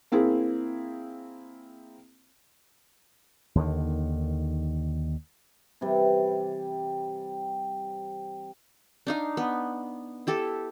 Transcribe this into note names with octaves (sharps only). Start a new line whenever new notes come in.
A#3 C4 E4 G#4
D#2 D3 D#3
C3 E3 G3
D4 D#4 F5
B3
E4 G4 A4